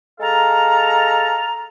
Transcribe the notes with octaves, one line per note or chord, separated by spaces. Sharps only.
G#3 A4 F5 A5 A#5